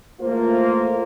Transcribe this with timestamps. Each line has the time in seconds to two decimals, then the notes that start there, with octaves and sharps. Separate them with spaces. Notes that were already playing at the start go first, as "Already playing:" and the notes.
0.21 E2 A3 A#3 F4 C5